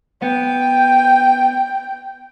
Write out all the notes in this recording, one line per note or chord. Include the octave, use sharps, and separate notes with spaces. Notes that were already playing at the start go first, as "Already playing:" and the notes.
B3 G5